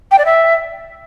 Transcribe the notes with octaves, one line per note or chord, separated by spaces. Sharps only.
G5
D5
E5